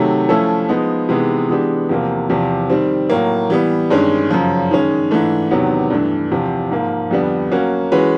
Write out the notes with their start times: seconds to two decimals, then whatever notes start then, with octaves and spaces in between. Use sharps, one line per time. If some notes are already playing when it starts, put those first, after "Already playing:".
Already playing: C3 D#3 F#3 A3
0.29 F3 A3 C#4 E4 A4
0.69 F3 G#3 B3 D#4
1.09 C3 E3 G#3 B3 D#4
1.50 E3 G#3 B3 D4 G4
1.89 E2 C3 F3 A#3
2.30 E2 C3 F3
2.70 D#3 G3 C4
3.10 A2 F#3 A#3
3.50 E3 G3 B3
3.90 G2 D#3 G#3 C#4
4.30 F#2 C#3 F3
4.71 D#3 G#3 C#4
5.11 G#2 E3 A3 D4
5.51 E2 C3 D#3 F#3 B3
5.90 G2 E3 A3 D4
6.31 E2 C3 F3
6.71 G#2 F3 A#3
7.11 F2 D3 G3 B3 D4
7.51 F#3 A#3 C#4 F#4
7.92 E3 G#3 C#4 F#4 B4